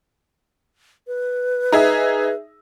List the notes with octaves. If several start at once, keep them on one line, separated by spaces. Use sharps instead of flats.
B4
D#4 G#4 E5